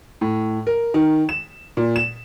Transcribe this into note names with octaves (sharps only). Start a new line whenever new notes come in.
A2
A#4
D#3
E7
A#2
E7